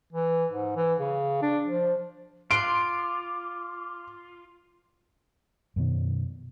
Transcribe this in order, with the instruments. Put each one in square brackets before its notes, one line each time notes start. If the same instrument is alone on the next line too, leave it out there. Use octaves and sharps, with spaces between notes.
[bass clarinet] E3
G#2
E3
C#3
D4
F3
[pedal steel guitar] F4 [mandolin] C6 F#6 [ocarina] D6 [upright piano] D7
[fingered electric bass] F#2 B2 D#3